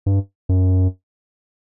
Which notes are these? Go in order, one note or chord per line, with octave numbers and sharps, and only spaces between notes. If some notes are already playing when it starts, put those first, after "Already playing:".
G2
F#2